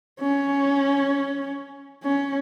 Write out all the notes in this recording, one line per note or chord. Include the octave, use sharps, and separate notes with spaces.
C#4
C#4